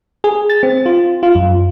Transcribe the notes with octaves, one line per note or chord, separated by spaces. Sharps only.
G#4
A6
C4
F4
F4
F#2